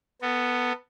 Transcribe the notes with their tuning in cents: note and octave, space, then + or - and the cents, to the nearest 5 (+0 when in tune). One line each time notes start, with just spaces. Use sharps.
B3 +0 A4 +30